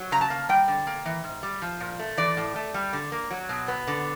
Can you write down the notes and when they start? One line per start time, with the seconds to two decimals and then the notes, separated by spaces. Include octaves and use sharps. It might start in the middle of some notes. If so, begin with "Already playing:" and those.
Already playing: F#3
0.11 C#3 A#5
0.21 A5
0.30 A#3
0.49 G3 G5
0.68 D3
0.87 A#3
1.05 E3
1.24 G#2
1.43 G3
1.62 F3
1.80 A#2
1.99 A3
2.17 E3 D5
2.37 A2
2.56 A3
2.74 G3
2.93 D3
3.12 A#3
3.31 F#3
3.49 B2
3.68 B3
3.87 D3